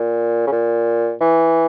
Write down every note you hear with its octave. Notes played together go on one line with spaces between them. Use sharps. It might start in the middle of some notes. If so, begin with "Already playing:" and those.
Already playing: A#2
C#3
A#2
E3